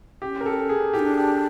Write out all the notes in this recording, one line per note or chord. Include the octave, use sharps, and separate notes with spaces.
C#4 G4
A#4
A4
G#4
E4 G4
D4
G4